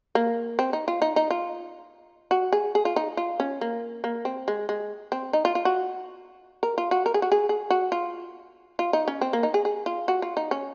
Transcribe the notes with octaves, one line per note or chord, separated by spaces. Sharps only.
A#3
C4
D#4
F4
D#4
D#4
F4
F#4
G#4
G#4
F4
D#4
F4
C#4
A#3
A#3
C4
G#3
G#3
C4
D#4
F4
F4
F#4
A#4
F4
F#4
A#4
G#4
F#4
G#4
G#4
F#4
F4
F4
D#4
C#4
C4
A#3
D#4
G#4
G#4
F4
F#4
F4
D#4
C#4